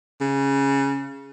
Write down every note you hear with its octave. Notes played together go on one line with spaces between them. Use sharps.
C#3